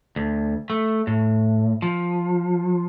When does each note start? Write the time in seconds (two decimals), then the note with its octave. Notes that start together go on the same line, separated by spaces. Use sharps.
0.16 D2
0.70 A3
1.07 A2
1.82 F3